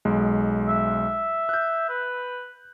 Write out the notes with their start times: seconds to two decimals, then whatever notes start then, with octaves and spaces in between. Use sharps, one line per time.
0.05 B1 G#3
0.68 E5
1.49 F#6 G6
1.90 B4